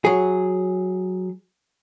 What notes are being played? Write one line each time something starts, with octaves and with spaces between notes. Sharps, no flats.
F#3 G#4